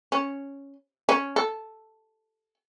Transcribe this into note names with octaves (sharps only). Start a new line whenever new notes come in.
C#4
C#4
A4